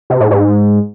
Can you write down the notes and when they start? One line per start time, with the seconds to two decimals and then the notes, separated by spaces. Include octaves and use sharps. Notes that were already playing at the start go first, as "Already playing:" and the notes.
0.10 C3
0.20 A2
0.31 G#2